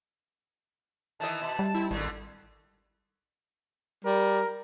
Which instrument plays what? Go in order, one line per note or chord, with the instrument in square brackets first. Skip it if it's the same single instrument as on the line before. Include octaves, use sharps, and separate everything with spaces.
[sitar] D#3 E3 D#5 [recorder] A5
[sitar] B2
[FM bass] G3
[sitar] C4 [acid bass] E4
[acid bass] G#1 [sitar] A#2 D3
[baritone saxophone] G3 [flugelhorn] A#4